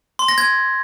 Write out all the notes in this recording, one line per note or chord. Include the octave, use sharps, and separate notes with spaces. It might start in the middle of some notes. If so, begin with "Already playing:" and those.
C6
A#6
G#6